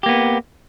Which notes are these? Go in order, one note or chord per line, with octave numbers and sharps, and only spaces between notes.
A#3 B3 G4